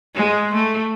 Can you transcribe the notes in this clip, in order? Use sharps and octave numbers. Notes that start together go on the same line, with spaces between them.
G#3
A3